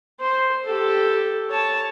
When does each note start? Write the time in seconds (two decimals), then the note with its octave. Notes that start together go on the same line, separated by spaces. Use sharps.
0.20 C5
0.64 G4 A4
1.50 C#5 A5